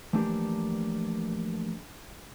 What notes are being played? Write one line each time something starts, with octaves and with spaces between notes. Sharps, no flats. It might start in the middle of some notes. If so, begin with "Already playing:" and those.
E3 F3 A3 A#3 D4 G4